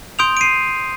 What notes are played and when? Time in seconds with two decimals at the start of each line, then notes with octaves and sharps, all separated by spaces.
0.19 C6 D#6 G6 D7 F7
0.37 D7
0.41 C7 D#7